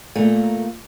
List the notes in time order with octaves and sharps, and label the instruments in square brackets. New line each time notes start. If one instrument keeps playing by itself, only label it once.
[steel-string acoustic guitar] A#2 A3 A#3